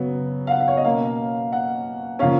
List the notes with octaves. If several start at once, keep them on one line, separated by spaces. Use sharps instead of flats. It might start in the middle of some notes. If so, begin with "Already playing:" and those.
Already playing: C#3 F#3 B3
F5
F#5
F5
C#5
D#5
B2 A#3 C#4 F5
F#5
C#3 F3 A#3 C#4 F5